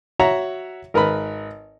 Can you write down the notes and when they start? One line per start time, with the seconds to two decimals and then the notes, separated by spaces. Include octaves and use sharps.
0.19 F#4 C#5 E5 F#5 A#5
0.94 G#1 A#4 B4 B5